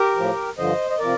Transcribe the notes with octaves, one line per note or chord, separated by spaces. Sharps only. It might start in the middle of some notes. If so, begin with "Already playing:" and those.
Already playing: G4 A#4
A2 F3
G2 D3 F3 C5 D#5
D#5
C3 F3 A#4 D5